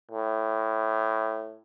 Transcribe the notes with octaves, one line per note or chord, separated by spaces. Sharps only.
A2